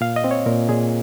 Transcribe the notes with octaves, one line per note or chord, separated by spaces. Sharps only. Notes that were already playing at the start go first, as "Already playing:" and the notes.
A#2 F5
D#5
C4
C#5
A#2 A#4
A#2 G#4